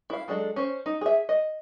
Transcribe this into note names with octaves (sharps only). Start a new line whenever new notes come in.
E4 F5
F#3 G#3 D4 A4
C#4 C5
D#4
G#4 E5
D#5